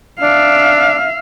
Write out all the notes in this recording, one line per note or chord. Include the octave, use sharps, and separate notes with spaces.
D4 E5 F5